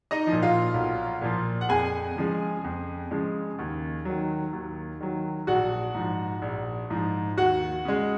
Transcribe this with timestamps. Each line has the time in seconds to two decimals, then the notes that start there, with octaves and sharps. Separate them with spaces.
0.11 D#4 D#5
0.27 F3
0.32 A#2
0.43 F4 F5
0.74 B1
1.22 A#2 F3
1.61 F#5
1.69 F2 G#4 G#5
2.16 C#3 F3 G#3
2.64 F2
3.11 C#3 F3 G#3
3.59 D#2
4.05 D#3 F#3
4.53 D#2
5.01 D#3 F#3
5.47 A#1 F#4 F#5
5.95 G#2 F3
6.42 A#1
6.90 G#2 F3
7.37 D#2 F#4 F#5
7.85 C#3 G#3